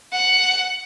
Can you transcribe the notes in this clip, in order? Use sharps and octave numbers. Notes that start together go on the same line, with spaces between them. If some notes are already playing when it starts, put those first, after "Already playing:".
F#5